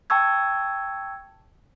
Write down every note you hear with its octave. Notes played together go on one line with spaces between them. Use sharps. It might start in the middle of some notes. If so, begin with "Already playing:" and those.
G5 A5 C#6 E6 G#6